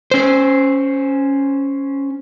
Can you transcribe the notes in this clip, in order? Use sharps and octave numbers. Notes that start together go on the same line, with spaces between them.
C#4 C5